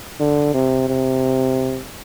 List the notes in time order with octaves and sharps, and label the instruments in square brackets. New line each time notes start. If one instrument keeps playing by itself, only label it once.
[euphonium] D3
C3
C3